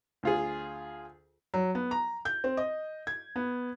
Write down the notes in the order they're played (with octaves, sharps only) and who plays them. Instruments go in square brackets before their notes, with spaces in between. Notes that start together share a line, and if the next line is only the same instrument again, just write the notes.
[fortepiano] D2 F4 G#4
[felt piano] F#3
B3
A#5
G6
C4
D#5
G#6
B3